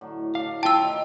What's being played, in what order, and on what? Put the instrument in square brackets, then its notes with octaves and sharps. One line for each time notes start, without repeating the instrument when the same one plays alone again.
[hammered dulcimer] A2 D3 F#3
[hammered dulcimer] A2 D4 [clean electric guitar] F5
[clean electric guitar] F4 A5 [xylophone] G5 E6
[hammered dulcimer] D#3 E5 D6